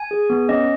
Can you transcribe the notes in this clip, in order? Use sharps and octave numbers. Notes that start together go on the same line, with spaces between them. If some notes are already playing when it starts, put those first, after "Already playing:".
Already playing: G#5
G#4
B3
C#4 D#5